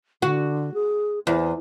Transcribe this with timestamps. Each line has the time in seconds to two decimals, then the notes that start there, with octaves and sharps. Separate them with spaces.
0.22 D3 F#4
0.74 G#4
1.27 E2 C5